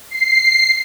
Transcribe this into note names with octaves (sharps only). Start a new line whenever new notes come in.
C7